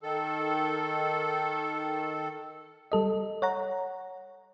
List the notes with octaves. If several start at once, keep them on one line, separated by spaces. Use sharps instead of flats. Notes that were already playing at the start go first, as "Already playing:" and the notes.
D#3 A4
G3 A4 D#5
C#5 F#5 A#5